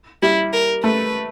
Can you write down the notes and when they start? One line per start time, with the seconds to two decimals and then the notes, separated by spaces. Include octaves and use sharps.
0.22 G3 E4
0.53 A#4
0.84 A3 B4